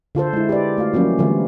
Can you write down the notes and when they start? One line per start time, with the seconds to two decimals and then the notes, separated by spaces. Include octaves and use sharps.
0.15 D3 F4 A4 C5
0.33 G#3 E4
0.49 G4 B4 D5
0.78 A3 F#4 F5
0.93 F3 F#3 A#3 C#4
1.19 D3 E3 G3 A3 F4